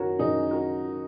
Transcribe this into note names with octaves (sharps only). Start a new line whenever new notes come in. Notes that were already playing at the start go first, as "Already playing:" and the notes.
Already playing: F#1 F#2 D#3 F#4 A#4 C#5
F#1 F#2 D#3 D#4 G#4
F#4 A#4
D#3